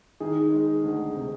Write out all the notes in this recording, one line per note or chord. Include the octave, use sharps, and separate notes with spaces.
D#3 G#4
G#3
D2
C3